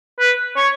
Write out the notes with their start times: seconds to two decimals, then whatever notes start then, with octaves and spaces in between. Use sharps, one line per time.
0.19 B4
0.56 C#5